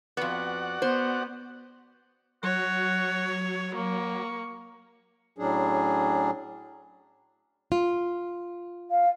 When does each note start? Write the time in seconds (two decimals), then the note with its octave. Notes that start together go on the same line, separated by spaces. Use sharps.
0.17 F2 B3 F#4 D5 F#5
0.82 B3 C5
2.43 F#3 F#4 C#5
3.76 A#3 C#6
5.38 A2 F#3 C#4 D4 G#4
7.72 F4
8.91 F5